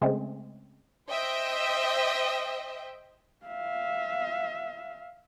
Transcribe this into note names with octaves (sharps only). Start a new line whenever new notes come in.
C#3 G#3 A3 C4 C#4
C5 D#5 E5 G5
E5 F5